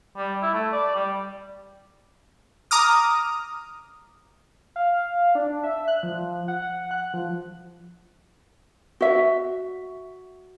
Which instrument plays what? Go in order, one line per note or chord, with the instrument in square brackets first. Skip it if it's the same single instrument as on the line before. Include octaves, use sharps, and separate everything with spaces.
[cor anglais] G3
E4
A3
D5
G3
[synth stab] A#5 D6 D#6 F6
[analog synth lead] F5
D4
E5
F#6
F3
F#5
F#5
F#6
F3
[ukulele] F#4 E5